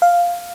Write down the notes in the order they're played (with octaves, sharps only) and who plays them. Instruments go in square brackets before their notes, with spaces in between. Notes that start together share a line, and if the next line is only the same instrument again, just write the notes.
[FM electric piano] F5